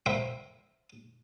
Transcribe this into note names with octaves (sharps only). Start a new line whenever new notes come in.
A#4 C5 E5 F5 G5 B5